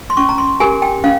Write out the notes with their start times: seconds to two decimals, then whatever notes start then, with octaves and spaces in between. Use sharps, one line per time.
0.10 C6
0.17 C#4 C#6
0.29 A#5
0.38 C6
0.60 G4 A#4 G#5
0.82 G5
1.04 C#4 F5